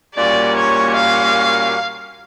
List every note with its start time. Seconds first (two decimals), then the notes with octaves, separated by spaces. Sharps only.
0.15 A#2 G3 A#3 C#4 F#4 D5
0.56 C#5
0.96 F5